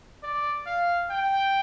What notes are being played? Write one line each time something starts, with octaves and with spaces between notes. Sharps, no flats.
D5
F5
G5